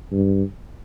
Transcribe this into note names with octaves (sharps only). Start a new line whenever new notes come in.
G2